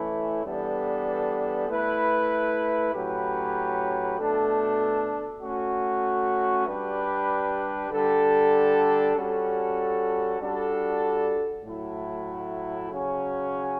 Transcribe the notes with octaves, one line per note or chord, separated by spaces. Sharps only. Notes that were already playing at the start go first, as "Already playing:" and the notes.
Already playing: E3 A3 C#4 E4
E3 G3 B3 D4 A4
A3 E4 B4
A2 F#3 C#4 G4 B4
B2 A3 D4 A4
A3 C#4 F#4
G3 D4 G4 B4
D3 G3 D4 A4
G3 C#4 F#4 A4
G3 D4 F#4 A4
A2 F#3 A3 E4
C#3 F#3 C#4